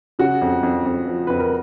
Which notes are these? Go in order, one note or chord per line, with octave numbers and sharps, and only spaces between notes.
C#3 F#4
F2
F2
F2
F3
F2 B4
A#4